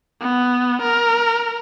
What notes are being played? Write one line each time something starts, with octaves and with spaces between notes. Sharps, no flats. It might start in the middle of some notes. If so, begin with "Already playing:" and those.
B3
A#4